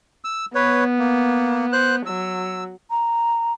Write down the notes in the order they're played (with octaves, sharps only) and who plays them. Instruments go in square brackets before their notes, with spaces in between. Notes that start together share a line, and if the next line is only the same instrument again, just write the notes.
[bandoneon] E6
[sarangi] B3 [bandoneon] B4 C#5
[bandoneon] A#3
C5 F#6
[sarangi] F#3 [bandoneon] E6
[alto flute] A#5